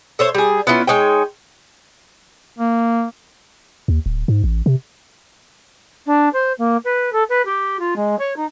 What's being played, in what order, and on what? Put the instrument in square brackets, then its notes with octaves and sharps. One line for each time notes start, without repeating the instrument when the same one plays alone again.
[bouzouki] A4 C5 C#5 E5
G3 G#4
B3 C#4 E4 F4
G#3 D#4 C#5 G5
[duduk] A#3
[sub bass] D#2
D1
G#2
A1
C3
[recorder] D4
C5
A#3
B4
A4
B4
G4
F4
G#3
C#5
D#4